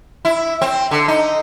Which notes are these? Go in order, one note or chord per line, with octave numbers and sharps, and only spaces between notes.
E4
C4
D3
D#4